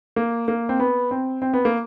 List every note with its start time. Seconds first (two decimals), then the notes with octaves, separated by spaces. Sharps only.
0.16 A#3
0.48 A#3
0.69 C4
0.80 B3
1.11 C4
1.42 C4
1.53 B3
1.65 A#3